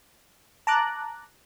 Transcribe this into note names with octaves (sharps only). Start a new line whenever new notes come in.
A5 A#5 D6 F#6